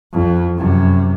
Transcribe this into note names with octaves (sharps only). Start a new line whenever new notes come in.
F2
F#2 C3